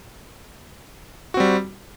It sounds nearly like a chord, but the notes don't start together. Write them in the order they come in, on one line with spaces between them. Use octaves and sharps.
F#4 C4 G3